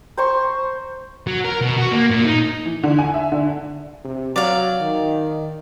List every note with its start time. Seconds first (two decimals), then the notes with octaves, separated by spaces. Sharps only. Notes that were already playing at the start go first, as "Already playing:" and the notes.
0.17 C5 A#5 C6 C#6
1.27 F#3
1.45 A#4
1.61 B2
1.77 F#4
1.92 A#3
2.10 A#2
2.25 D#4
2.66 E3
2.83 D3
2.98 G#5
3.14 E5
3.32 D3
4.04 C3
4.36 F#3 D5 F5
4.80 D#3